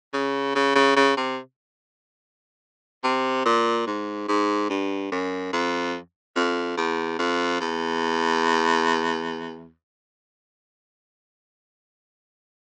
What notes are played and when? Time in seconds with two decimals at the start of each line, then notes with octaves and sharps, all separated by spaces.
0.13 C#3
0.55 C#3
0.75 C#3
0.96 C#3
1.17 C3
3.04 C3
3.46 A#2
3.87 G#2
4.28 G#2
4.70 G2
5.12 F#2
5.53 F2
6.36 F2
6.77 E2
7.19 F2
7.61 E2